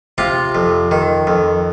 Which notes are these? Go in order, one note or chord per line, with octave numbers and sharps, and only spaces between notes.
C3 F4
F2
D#3
F2